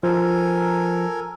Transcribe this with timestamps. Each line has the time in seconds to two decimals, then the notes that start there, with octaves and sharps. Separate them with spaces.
0.03 F3 A4 A#4 G#5